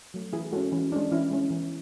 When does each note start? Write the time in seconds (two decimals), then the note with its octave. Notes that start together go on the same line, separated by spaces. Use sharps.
0.14 F#3 A3
0.33 E3 E4 G#4
0.53 G#3 C#4 F#4 A4
0.72 E3 C#4
0.92 G#3 C#4 D4
1.12 E3 C#4 E4
1.31 G#3 C#4
1.51 E3